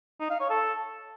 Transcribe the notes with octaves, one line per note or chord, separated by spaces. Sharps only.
D#4
F5
C#5
A4